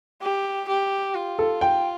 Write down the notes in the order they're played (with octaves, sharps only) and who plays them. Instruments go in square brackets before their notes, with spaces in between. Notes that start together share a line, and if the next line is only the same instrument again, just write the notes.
[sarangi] G4
G4
F4
[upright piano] A4
G5